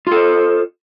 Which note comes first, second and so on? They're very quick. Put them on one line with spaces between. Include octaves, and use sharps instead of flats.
F4 A4 C5